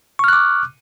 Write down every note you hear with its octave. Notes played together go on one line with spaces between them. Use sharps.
C#6 D6 F6 F#6